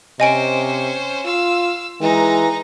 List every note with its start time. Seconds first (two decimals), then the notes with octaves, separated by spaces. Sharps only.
0.20 C3 C#4 C5 D#5 G#5 D7
1.25 F4 F5 E6
2.01 E3 G#3 D#4 A#5